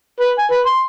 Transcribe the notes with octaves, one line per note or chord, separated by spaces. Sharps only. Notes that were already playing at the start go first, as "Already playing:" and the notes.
B4
G#5
B4
C6